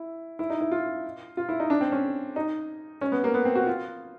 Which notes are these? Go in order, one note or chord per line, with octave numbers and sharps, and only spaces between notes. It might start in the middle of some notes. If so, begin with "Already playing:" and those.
Already playing: E4
E4
D#4
E4
F4
F4
E4
D#4
D4
C4
C#4
D#4
C#4
B3
A#3
B3
C4
F#4
F4